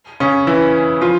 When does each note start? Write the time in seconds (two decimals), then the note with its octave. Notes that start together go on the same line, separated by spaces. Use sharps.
0.20 C#3 C#4
0.47 E3 E4
1.01 F3 F4